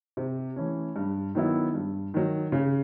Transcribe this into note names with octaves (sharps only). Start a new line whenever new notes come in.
C3
E3 A3 C#4
G2
D#3 F#3 B3 E4
G2
D#3 F#3
C#3